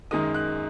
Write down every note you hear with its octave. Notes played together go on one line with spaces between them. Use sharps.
F#2 D#3 G#3 D#4 D#6
F#6